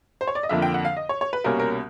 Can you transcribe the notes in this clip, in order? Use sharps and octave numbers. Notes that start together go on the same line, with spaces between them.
C5
C#5
D5
D#5
F2 D3 F3 A#3 E5
G5
F#5
F5
D#5
C#5
C#5
B4
C2 B2 G3 A#3 C#4 A#4
A#4